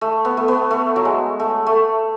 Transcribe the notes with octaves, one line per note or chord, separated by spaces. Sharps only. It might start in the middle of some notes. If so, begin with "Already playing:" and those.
A3
B3
A3
B3
A3
F#3
G#3
A3
A3